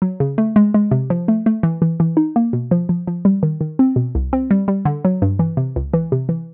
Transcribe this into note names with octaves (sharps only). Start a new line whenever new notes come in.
F#3
C#3
A3
G#3
G#3
C3
F3
A3
A3
E3
E3
E3
D#4
A#3
B2
F3
F3
F3
G3
D#3
D#3
C4
B2
C2
C4
G3
G3
D3
F#3
G2
E3
C3
C#2
E3
C3
E3